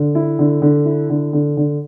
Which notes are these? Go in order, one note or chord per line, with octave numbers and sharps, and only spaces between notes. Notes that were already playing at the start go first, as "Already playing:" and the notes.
Already playing: D3
E4
D3
D3
E4
D3
D3
D3